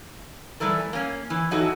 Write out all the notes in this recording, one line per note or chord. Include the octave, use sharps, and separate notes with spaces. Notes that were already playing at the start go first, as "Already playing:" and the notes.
E3 G3 A3 A4 A#4
A#3 C#4
E3
E3 F#3 D#4 E4 F#4 A4